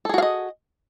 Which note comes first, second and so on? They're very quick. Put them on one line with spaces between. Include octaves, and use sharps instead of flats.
A4 G#4 F#4 F5 D#5